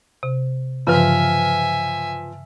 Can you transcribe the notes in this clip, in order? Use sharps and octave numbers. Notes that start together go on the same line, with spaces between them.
C3
G2 C#3 E3 F3 B4 E5 G#5 F6